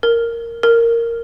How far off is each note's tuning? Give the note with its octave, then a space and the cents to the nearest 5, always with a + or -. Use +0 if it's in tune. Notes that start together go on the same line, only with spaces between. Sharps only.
A#4 -5
A#4 -10